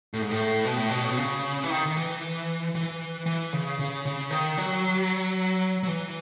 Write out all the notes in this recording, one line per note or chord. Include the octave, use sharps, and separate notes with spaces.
A2
G#2
A2
B2
A2
B2
A2
B2
C#3
E3
D#3
D#3
E3
E3
E3
C#3
C#3
C#3
D#3
F#3
F#3
E3